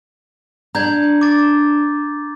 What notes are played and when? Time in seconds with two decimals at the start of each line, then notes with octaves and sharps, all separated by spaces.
0.75 D4 A#5 G6 G#6
1.21 D6 A6